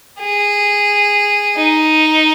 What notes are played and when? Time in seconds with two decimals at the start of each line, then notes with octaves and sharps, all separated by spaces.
0.20 G#4
1.57 D#4